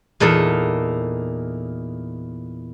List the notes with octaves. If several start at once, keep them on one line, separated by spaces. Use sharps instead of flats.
E2 A#2 D#4 A4